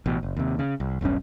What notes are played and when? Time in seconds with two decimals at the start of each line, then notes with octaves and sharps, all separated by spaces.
0.06 A1 B2
0.23 F#1
0.37 D#2 C3
0.59 C#3
0.80 C2
1.01 E1 B1 G2 C#4